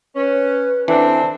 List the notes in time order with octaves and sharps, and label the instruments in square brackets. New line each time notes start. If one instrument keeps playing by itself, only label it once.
[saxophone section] C#4 [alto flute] B4
[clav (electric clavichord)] E3 [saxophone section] C4 D4 [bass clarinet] A4